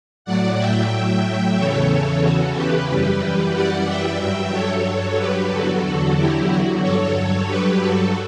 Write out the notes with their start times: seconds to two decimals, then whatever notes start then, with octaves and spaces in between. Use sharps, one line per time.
0.25 A2 F#3 D5 F#5
0.58 E5 G5
1.56 E2 C#3 E3 A4 C#5
2.22 F#4 A4
2.55 G4 B4
2.88 F#2 E3 G3
3.53 D5 F#5
3.87 E5 G5
4.19 G2 F#3 E5 G5
4.52 A4 C#5
4.85 A4 C#5
5.17 G4 B4
5.51 E2 D3 F#3 F#4 A4
5.83 F#4 A4
6.17 E4 G4
6.49 F#4
6.82 G2 F#3 A4 C#5
7.48 G4 B4
7.80 F#4 A4